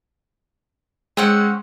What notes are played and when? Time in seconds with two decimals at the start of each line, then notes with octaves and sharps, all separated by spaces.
1.17 G#3 C4 C#4 F#5